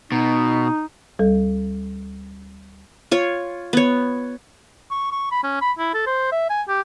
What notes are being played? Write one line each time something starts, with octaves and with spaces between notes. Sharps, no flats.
B2 D#4
D2 G3 A4
F4 C#5
B3 C#5
C#6
C#6
B5
C#4
B5
E4
A4
C5
E5
G#5
G4